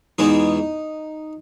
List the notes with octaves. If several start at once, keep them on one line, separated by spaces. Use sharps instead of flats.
E2 B2 G#3 D#4